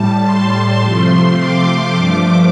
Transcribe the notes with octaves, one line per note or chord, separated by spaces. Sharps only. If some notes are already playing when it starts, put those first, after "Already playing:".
Already playing: A2 G3 A5
C6
C3 F3 A3
D6
G2 F3 A3